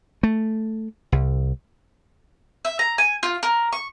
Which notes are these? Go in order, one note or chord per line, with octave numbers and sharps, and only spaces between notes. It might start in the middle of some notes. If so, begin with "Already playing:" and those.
A3
C2
E5
A#5
G#5
F4
A#4
C#6